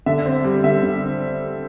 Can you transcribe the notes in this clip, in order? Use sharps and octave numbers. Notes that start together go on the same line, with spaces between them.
D3 E5
C4
G3
D3 E5
D3